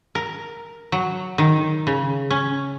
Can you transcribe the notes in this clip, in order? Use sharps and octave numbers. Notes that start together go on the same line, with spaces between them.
A#4
F#3
D#3
C#3
C#4